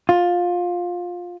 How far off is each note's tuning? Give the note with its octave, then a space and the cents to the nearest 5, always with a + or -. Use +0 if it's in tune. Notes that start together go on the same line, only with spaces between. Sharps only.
F4 +15